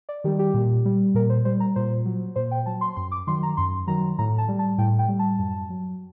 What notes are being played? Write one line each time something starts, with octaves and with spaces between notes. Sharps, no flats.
D5
D#3 G3 G4
G4
A#2
G3
A#2 A#4
C5
G3 C5
A#5
A#2 C5
F#3
A#2 C5
G5
F#3 A5
C6
F#2 C6
D6
D#3 F#3 C6
A#5
F#2 C6
D#3 F#3 A#5
A2 A#5
A5
G3
A5
A2 G5
G5
G3
A5
F#2
F#3